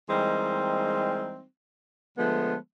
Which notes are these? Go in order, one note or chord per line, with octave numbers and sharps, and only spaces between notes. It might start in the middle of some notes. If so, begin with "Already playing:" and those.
E3 G3 G#3 A#3 C4 D#4
D3 F3 G#3 A3 B3